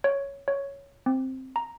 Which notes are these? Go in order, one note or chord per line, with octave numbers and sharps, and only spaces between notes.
C#5
C#5
C4
A#5